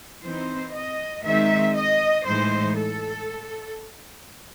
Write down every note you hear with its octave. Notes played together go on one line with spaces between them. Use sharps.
E3 C4 D#4 C5
D#5
D#3 G#3 C4 D#4 E5
D#5
A2 E3 G#3 D#4 C5
A4